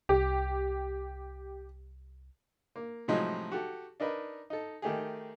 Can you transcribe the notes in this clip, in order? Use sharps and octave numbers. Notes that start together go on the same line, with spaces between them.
C2 G4
A#3
A2 C3 F3 F#3 G#3 D#4
F#4 G4 A4
D4 D#4 A#4 B4
D#4 A4
D#3 A3 G4 G#4